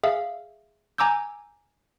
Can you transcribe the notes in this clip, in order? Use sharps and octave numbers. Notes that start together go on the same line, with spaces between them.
G#4 E5 F5
G#5 A#5 D6 E6 G6